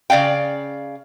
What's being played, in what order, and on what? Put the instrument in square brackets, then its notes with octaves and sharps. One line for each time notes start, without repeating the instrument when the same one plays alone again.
[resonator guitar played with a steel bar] C#3 D5 F5 G5